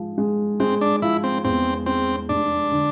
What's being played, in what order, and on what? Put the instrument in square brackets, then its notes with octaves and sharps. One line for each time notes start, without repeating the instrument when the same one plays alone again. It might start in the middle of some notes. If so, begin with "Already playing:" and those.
Already playing: [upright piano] F3 G#3
G#3
[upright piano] G#3 [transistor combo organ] C4
[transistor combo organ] D4
[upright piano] F3 [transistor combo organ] E4
[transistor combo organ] C4
[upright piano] E2 [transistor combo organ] C4
[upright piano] G#3 [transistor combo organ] C4
[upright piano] F1 [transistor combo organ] D4
[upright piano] D3